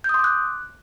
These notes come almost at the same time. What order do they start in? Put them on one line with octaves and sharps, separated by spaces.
G6 D#6 C6 D6 F#6